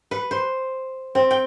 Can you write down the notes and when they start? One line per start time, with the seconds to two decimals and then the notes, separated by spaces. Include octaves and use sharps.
0.11 B4
0.31 C5
1.15 C4
1.31 G5